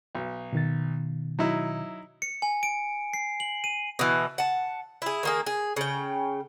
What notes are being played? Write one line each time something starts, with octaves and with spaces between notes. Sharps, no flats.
B1
B2 D#3 A6
F#3 D#4 E4
C#7
G#5
D7
C7
F#7
D#7
B2 E3
F#5 A5
E4 G#4
D#3 A#3 G#4
G#4
C#3 G5